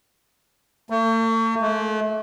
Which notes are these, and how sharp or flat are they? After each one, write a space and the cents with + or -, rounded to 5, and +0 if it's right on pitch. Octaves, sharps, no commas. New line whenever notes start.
A3 +45
A3 -35